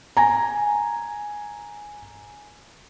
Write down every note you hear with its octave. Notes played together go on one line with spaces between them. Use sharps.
G#5 A#5